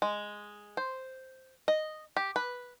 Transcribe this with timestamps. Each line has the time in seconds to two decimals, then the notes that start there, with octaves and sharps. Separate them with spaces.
0.02 G#3
0.77 C5
1.68 D#5
2.17 G4
2.36 B4